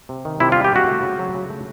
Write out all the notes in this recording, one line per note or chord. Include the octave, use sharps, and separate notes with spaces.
C3
D#3
C3 E4
F4
G3
G4
C3 F#4
A3
C#3
F#3
C#3
A3